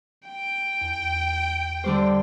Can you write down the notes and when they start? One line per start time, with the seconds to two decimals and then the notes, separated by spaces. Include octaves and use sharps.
0.27 G5
0.81 E2
1.84 D3 G3 C5